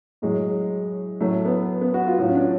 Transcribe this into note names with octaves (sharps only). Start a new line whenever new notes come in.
A2 F#3 G#3
A2 F#3 A3
B3
B3
F#4
F4
A2 F#3 F4
C#4
D4